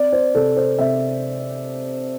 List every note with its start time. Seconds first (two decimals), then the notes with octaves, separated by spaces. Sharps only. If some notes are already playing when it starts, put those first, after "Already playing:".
Already playing: C4 D5
0.13 C5
0.35 C3 A4
0.57 C5
0.79 C3 E5